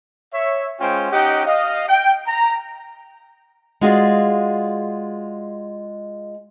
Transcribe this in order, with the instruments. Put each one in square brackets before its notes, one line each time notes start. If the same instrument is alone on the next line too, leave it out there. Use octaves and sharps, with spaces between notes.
[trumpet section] C#5 E5
G#3 C#4 F4 C5 G5
C#4 D#4 G4 D#5 F#5 G5
D#5 F5
G5
A#5
[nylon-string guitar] G#3 F4 F#4 G#4 D5 F5